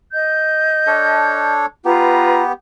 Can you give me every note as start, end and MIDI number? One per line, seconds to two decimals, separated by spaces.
0.13 1.52 75
0.13 1.52 91
0.87 1.66 62
0.87 1.66 69
0.87 1.66 73
1.85 2.53 59
1.85 2.43 65
1.85 2.53 67
1.85 2.43 71
1.85 2.43 82